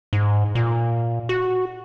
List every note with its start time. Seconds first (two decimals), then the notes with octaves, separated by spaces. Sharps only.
0.13 G#2
0.55 A#2
1.29 F#4